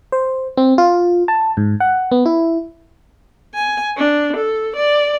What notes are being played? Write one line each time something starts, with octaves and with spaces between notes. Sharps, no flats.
C5
C4
F4
A5
G#2
F#5
B3
E4
G#5
D4
A4
D5